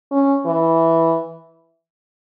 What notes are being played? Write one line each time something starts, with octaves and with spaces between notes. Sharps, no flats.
C#4
E3